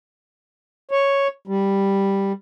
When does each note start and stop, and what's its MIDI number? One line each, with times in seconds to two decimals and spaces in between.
0.91 1.28 73
1.47 2.32 55